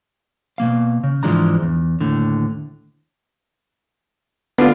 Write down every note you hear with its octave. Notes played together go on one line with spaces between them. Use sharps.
B2 E3 A#3 F5
C#3
G#2 E3 F3 G#3 D4 A#5
E2
D#2 A2 D3
D3 B3 F4